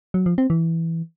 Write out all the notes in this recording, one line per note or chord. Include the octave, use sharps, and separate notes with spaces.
F#3
F3
C4
E3